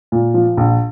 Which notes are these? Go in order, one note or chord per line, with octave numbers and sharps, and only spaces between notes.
A#2
F3
A#1